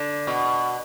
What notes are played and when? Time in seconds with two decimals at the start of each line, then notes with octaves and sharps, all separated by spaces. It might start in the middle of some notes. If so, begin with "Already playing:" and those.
Already playing: D3
0.27 B2